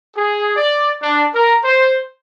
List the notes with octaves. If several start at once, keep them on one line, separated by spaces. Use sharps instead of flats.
G#4
D5
D4
A#4
C5